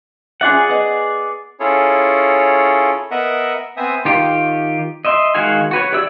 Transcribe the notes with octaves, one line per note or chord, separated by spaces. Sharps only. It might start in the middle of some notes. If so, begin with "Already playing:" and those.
C#4 F4 G#4 D5 E5 F#5
B3 D#5
C#4 E4 F4 G#4 A4 C#5
B3 A#4 D#5 E5 F#5
B3 C4 C5 E5 G#5 D#6
D#3 F4 G4
D#5 E5 C6
D#3 G#3 F#4 F5 G#5
F#4 B4 C#5
G4 D5 E5 E6